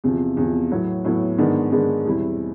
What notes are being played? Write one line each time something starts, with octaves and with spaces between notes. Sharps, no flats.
E2 C3 F3
E2 C3 F3
A2 F#3 B3
A2 F#3 B3
G#2 D#3 G#3 B3 D4
G#2 D#3 G#3 B3 D4
E2 B2 G3 C4 E4